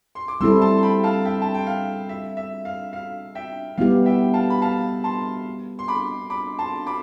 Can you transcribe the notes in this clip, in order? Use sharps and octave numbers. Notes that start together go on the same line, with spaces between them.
C6
D6
G3 C4 E4 A4 C6 E6
A5 C6
C6
G5 B5
F5 A5
E5 G5
A5
G5
F5
E5
E5
F5
F5
E5 G5
G3 B3 E4 G4 F5
E5 G5
F5 A5
B5
F5 A5
A5 C6
C6
B5 D6
B5 D6
A5 C6
B5 D6